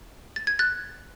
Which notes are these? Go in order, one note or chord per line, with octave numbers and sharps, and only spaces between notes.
A6
G#6
F#6 A6